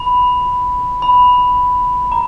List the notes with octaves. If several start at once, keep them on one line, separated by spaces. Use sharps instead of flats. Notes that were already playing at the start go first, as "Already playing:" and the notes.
Already playing: B5
B5
A#5